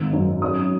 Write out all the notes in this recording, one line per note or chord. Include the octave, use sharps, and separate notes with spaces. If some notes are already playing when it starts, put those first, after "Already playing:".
Already playing: G#1 G#2
F#2
C#4 D#6